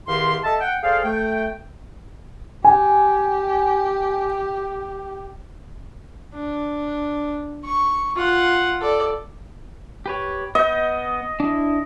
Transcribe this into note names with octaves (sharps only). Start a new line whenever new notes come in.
E2 D#3 G4 F5 C6
A4 D#5 E5 A5
F#5 G5
G#4 A4 C5 D5 F5
A3 G5
G4 G#5
D4
C#6
F4 F#5
A4 D5
G4 B4 C#5
B3 D#5 G6
D4 E4